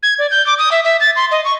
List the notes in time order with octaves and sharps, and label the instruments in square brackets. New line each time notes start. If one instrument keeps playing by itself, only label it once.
[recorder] G#6
D5
G6
D6
D#6
E5
E5
A6
C6
D#5
C#6